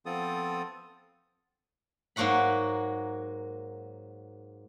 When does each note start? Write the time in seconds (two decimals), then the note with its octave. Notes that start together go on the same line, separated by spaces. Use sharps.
0.06 F3 B3 C4 F4 A4 D#6
2.16 G#2 F#3 A#3 F#4 F#5 B5